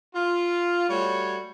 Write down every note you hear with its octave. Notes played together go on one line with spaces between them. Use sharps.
F4
G3 A3 F#4 C#5